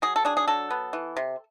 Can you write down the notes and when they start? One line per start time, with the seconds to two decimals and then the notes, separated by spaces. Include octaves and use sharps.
0.02 F#3 G#4
0.16 A4
0.25 D4 G#4
0.37 G#4
0.48 F#3 A4
0.71 B3
0.93 E3
1.17 C3